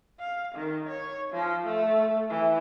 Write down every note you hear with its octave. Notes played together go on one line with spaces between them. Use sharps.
F5
D#3
C#5
F3
A3
E3